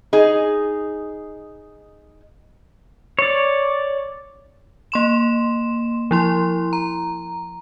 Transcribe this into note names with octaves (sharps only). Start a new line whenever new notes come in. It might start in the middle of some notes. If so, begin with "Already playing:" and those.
D#4 G#4
C#5 D5
A#3 C6 E7
F3 E4 C6
A#5